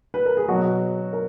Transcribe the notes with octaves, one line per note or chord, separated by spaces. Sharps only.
B4
A#4
G#4
B2 F#3 F#4
A#4